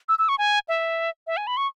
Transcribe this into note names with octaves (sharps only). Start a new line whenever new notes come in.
E6
E6
C#6
G#5
E5
E5
G#5
B5
C#6